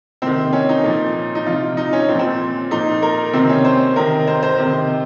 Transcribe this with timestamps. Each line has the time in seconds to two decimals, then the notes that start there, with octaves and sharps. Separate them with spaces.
0.22 C3 D#3 C4
0.53 C#4
0.69 D#4
0.84 A#2 F3
1.35 D#4
1.46 C3 F3 F4
1.77 D#4
1.93 C#4
2.08 A#2 F3 C4
2.19 C4
2.71 A#2 F3 D#4
3.02 A#4
3.33 C3 D#3 C4
3.49 C#4
3.65 C5
3.96 C3 D#3 A#4
4.27 C5
4.43 C5
4.58 C3 D#3